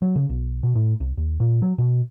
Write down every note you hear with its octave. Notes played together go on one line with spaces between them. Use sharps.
F#3
C#3
B1
B2
A2
C2
D#2
A#2
F#3
B2